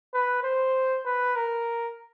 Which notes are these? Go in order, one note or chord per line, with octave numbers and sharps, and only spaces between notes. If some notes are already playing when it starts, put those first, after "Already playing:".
B4
C5
B4
A#4